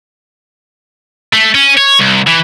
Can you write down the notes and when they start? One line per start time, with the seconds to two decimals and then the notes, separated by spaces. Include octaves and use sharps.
1.33 A3
1.55 C#4
1.78 C#5
2.00 C2
2.27 E3